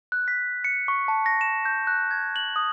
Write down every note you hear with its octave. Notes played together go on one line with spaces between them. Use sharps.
F#6
B6
C#7
C#6
A5
A#6
E7
G6
F#6
G#6
F#7
D#6